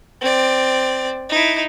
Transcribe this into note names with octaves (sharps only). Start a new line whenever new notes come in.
C4 D5
D#4 E4